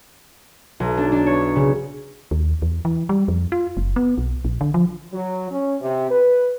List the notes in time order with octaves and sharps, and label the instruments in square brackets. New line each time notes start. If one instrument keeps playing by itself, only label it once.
[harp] B1
D4
D4
C#5
C#3
[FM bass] D#2
E2
E3
G3
F2
F4
F#1
B3
B1
A#1
D3
F3
[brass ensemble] F#3
C#4
C3
B4